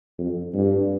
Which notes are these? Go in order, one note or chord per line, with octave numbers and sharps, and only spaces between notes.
F2
G2